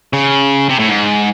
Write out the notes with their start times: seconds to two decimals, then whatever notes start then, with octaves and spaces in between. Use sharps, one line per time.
0.13 C#3
0.69 C3
0.79 A2
0.89 G#2